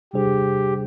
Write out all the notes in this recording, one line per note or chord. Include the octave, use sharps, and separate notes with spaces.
C3 G3 D4 G4 G#4 C5